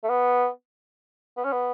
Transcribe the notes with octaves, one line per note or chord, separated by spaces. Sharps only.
A3
B3
B3
C#4
B3